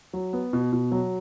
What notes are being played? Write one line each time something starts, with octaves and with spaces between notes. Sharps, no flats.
F#3
B3
B2
B2
F#3